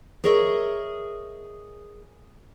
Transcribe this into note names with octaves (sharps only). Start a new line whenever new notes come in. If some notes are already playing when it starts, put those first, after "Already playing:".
G#4 A#4 C#5 D#5 E5